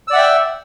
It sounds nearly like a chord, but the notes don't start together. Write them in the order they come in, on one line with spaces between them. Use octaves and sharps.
E6 D5 F#5 E5 G5